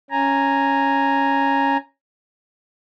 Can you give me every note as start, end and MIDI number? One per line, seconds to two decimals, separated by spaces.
0.11 1.77 61
0.11 1.77 80
0.11 1.77 82